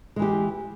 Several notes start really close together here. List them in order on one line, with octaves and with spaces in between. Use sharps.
G#3 E3 G4